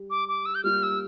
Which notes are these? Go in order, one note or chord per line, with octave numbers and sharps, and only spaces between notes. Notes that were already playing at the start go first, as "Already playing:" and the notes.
Already playing: G3
D6
D6
E6
G6
G3 A#3 F4 F6
E6